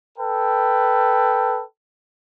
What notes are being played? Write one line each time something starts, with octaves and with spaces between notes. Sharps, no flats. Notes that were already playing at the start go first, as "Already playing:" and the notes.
A4 B4 G5